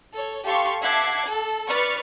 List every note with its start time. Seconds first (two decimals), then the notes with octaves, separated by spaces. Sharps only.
0.13 A4 C#5
0.44 G4 A4 F5 A5 C6 C#6
0.82 E5 F#5 A5 D6 G#6 C7
1.26 A4
1.68 B4 D5 C#6 F6 A6